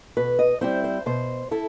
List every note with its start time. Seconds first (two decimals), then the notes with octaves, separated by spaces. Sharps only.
0.17 B2 B4
0.39 D#5
0.61 G3 C4 E4 C5
0.84 C5
1.06 B2 C5
1.51 E4 A4